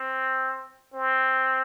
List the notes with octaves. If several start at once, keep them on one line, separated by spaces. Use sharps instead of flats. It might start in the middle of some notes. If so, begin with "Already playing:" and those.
Already playing: C4
C4